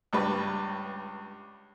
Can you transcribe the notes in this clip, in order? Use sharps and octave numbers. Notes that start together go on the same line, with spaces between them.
C#2 G2 B4